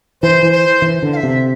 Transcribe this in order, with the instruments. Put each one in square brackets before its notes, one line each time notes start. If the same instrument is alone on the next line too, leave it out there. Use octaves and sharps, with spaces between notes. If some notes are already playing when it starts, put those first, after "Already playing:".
[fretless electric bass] E3 [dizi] C5
[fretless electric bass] E3
[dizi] C5
[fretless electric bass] E3
D3
[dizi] F5
E5
[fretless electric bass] C3